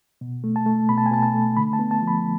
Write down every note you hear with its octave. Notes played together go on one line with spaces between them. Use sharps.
B2
A3
A5
A3
B2 B5
A5
G#5
B2 A5
A5
A3
D3 B5
A5
B3
A5
F3
B5